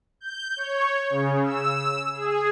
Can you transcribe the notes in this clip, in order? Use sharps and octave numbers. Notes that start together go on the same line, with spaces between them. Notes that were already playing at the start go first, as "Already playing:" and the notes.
G6
C#5
C#3
E6
G#4